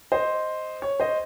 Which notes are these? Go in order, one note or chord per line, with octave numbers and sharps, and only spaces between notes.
C5 D#5
C#5
C5 D#5